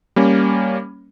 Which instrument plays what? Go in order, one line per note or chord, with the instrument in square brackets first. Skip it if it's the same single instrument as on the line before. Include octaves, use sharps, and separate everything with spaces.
[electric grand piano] G3 A#3 C#4